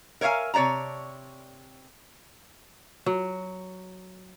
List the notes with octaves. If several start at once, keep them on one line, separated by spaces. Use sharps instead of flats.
A#4 C#5 E5 F5 G#5
C3 C#5 D5 A5 A#5
F#3